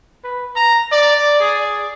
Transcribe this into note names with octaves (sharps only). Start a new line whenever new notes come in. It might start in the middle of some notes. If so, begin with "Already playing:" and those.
B4
A#5
D5
G#4